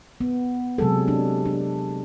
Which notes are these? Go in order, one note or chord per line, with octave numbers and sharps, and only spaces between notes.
B3
C3 F#3 G#3 G#4 A4
D4
D4